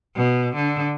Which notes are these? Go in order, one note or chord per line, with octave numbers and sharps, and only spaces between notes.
B2
D3